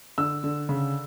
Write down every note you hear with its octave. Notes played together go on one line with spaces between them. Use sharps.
D3 E6
D3
C#3